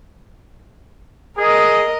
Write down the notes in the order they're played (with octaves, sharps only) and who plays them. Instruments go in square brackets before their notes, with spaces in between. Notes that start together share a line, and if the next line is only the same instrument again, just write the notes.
[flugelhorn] G#4 [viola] A#4 D#5